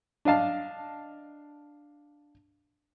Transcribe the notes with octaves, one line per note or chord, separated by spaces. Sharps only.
D4 D#5 F5 A5